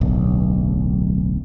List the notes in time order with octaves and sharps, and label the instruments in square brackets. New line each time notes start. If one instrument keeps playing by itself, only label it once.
[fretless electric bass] D1 B1